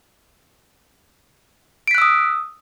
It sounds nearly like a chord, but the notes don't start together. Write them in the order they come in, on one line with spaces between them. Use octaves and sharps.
D7 B6 F#6 E6 D#6